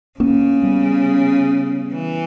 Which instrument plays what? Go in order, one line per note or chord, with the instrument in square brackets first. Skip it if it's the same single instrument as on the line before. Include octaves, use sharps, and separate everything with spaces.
[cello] C#3 [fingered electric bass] A#3 C#4
[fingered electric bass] G3 B3
[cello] E3